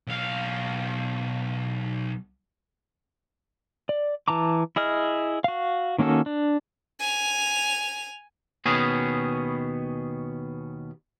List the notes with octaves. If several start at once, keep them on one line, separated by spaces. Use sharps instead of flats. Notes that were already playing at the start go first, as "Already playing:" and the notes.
B1 F5
D5
E3 A5 A#5 D6
E4 G#4 D#5 F6
F#4 F5
D#3 A#3 C#4 F#4 A4
D4
G#5 F7
D#2 B2 B3 C#4 G#4